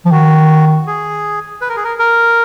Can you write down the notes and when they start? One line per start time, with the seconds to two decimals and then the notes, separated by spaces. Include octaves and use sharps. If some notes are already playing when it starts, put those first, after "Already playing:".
0.06 F3
0.12 D#3 F#4
0.87 G#4
1.61 B4
1.69 A#4
1.76 G#4
1.84 A#4
1.99 A#4